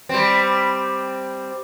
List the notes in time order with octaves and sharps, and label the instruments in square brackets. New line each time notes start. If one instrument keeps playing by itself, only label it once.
[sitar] G3 C4